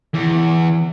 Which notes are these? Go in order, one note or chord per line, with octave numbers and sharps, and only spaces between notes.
E2